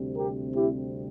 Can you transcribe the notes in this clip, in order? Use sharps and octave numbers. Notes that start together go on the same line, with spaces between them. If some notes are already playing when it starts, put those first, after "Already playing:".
Already playing: D2 C3 G3 C4
G4 A#4
E4 G4